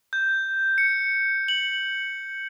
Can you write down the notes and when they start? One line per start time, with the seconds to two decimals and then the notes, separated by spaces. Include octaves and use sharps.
0.13 G6
0.78 C#7
1.48 F#7